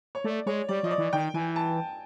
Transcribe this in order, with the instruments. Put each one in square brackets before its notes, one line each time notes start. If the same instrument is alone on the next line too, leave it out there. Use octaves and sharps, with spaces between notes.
[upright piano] C#5
[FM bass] A3 [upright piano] D5
[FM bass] G#3 [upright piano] C#5
[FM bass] G3 [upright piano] D5
[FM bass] F3 [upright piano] D#5
[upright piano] D5
[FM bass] E3
[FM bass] D#3 [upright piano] G5
[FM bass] E3 [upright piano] G#5
[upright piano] A5